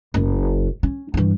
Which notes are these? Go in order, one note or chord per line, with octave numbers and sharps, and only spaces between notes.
F#1
C#4
G2 E3